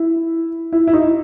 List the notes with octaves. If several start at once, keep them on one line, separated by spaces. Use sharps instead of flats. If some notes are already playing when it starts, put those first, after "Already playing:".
Already playing: E4
E4
E4
D#4